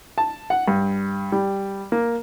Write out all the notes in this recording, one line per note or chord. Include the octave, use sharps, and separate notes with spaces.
A5
F#5
G2
G3
A#3